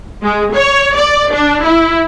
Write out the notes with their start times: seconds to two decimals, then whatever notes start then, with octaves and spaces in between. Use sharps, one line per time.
0.23 G#3
0.54 C#5
0.96 D5
1.32 D4
1.65 E4